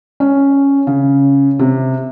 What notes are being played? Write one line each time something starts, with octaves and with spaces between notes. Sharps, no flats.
C#4
C#3
C3